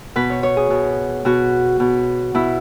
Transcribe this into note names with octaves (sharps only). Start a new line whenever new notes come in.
B2 B4
C#5
C#5
G#4
B2
B2 F#4
B2
B2 E4